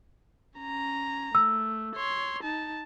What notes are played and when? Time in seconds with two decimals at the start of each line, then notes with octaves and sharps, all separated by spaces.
0.60 C#4 A#5
1.35 A3 E6
1.95 C#5 C6
2.43 D#4 A5